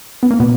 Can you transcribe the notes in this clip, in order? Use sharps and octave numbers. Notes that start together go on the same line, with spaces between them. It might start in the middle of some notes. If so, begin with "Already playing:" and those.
B3
A#3
B2 B3